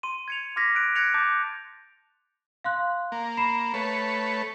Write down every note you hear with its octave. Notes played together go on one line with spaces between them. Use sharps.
C6 D#7
G#6 C#7 F7
C6 D6 F6 G#6 A#6 B6
F#6 A6 D7
F#6 G#6 A#6 C#7 D7 F7
A5 D6 G6 A6
F5 C6 F#6
A#3
B5 C7 E7
A3 B4 C#5